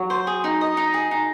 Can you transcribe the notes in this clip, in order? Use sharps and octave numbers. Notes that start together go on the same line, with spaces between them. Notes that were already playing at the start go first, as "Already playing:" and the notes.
Already playing: F#3
C5
G#4
D#4
D#5
D#4
G#4
D#4